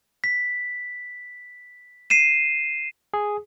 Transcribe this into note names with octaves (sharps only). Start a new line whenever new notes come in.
B6
C7 D#7 E7
G#4